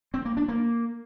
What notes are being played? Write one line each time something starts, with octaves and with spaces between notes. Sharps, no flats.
C4
A#3
D4
A#3